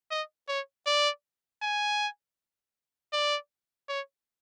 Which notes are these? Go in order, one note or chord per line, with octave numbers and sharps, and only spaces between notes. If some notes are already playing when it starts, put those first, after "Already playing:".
D#5
C#5
D5
G#5
D5
C#5